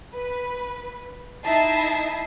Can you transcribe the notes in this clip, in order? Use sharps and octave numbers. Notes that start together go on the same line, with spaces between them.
B4
D#4 E4 D#5 E5 A5 C7